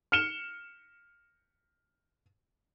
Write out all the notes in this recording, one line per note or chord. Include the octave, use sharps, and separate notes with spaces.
F6 C#7 E7 G7